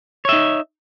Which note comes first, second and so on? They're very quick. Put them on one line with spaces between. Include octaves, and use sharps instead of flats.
C#5 E5 D#4